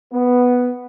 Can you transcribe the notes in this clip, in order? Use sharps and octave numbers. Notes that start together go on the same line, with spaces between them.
B3